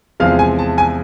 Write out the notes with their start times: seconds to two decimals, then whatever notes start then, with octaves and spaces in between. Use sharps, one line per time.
0.20 E2 C3 F3 G#3 F5
0.39 G#5
0.59 A5
0.78 G#5